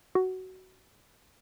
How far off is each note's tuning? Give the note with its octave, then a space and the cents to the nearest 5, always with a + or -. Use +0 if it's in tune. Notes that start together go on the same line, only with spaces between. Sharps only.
F#4 +15